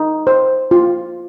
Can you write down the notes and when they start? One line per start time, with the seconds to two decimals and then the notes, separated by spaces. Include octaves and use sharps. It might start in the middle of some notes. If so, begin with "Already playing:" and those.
Already playing: D#4
0.27 C5
0.71 F4